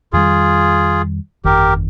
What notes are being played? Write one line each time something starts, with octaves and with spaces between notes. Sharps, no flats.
F2 D#3 G3 F4 G#4
G1 F2 D#3 G4 A#4